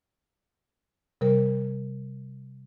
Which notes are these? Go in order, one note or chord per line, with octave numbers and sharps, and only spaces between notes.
C3 G3 A#4